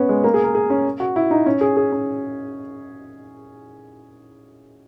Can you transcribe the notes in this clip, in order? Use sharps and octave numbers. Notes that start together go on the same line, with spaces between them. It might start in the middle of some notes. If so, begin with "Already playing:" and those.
Already playing: B3 C#4
G#3
A#3
G#4
A#4
G#4
C#4
F#4
E4
D#4
C#4
G#4
G#4
C#4